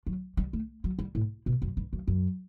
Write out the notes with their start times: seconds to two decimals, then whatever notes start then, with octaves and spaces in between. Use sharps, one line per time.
0.06 F#3
0.37 G3
0.53 A3
0.84 F#3
0.99 G3
1.15 A2
1.46 B2
1.62 F#2
1.77 G2
1.93 F#2
2.08 F#2